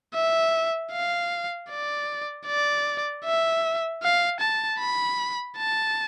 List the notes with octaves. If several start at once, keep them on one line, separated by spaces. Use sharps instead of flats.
E5
F5
D5
D5
E5
F5
A5
B5
A5